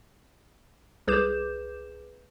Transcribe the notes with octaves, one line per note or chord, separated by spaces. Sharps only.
C2 G#4 B4 D6 G6 E7